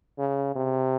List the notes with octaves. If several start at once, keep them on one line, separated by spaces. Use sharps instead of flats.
C#3
C3